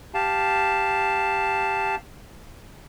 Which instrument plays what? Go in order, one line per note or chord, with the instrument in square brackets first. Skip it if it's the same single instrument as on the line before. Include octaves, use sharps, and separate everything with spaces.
[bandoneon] G4 F5 A5